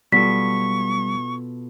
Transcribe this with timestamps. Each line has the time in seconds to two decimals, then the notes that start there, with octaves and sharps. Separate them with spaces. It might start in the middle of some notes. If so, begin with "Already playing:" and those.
0.12 B2 G3 F4 A4 C#6 B6